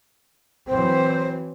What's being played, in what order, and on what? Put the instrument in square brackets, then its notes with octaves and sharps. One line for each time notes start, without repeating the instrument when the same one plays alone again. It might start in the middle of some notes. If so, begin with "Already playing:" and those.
[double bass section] E3 F#3 C4 [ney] C5